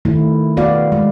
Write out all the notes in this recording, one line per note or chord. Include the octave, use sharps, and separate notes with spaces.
D#3 A3 E4
B3 F#4 D5 F5
G#3